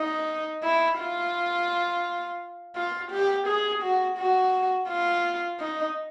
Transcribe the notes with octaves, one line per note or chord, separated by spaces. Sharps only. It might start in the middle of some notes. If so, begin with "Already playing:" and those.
Already playing: D#4
E4
F4
F4
G4
G#4
F#4
F#4
F4
D#4